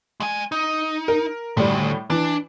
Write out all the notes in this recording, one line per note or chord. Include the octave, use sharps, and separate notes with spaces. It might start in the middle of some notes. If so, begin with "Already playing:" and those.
G#3 G#5
D#4
A#4
D2 A2 G3
E3 D4